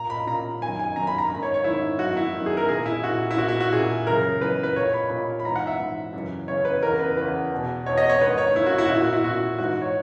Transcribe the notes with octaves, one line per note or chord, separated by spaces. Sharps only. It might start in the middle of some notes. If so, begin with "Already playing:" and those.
Already playing: A#2 A#5
B5
A#2 A#5
F#2 D#3 G#5
G#5
F#2 D#3 A#5
B5
A#5
G#2 D#3 B5
C#5
C#5
G#2 D#3 E4
F#2 D#3 F#4
E4
F#2 D#3
G#4
A#4
A#2 G#4
E4
A#2 F#4
E4
A#2 F#4
E4
F#4
A#2 G#4
F#2 C#3 E3 A#4
F#2 C#3 E3 B4
B4
A#2 C#5
B5
A#2 B5
B5
G#2 E3 A#5
F#5
E5
G#2 E3
F#2 C#3 E3
F#2 C#3 E3 C#5
B4
E2 C#3 E3 A#4
B4
E2 C#3 E3 B4
E2 B2
E2 B2 C#5
D#5
C#5
G#2 D#3 B4
C#5
G#2 D#3 E4
F#4
E4
F#4
A#2 E4
F#4
E4
A#2 F#4
G#2 E3 F#4
C#5